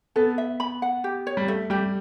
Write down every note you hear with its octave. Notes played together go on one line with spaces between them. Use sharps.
B3 A4
E5
B5
F#5
G4
C#5
G3
A3 E5
G3 G4